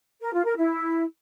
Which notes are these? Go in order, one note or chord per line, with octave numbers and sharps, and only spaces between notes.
A#4
F4
A#4
E4